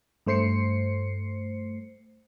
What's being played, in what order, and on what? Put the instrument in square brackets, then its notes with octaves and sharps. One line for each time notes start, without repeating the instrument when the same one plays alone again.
[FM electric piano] G2 A3 C5 C7 C#7